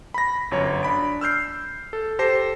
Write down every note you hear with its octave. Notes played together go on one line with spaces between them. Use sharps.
B5 A#6
G1 F#2 C#5
D4 B5 D7
E6 F6 G6 C7
A4
G4 A4 C5 A5 A#6 C7